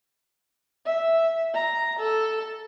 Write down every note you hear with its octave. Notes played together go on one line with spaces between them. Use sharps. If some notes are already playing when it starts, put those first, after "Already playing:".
E5
A#5
A4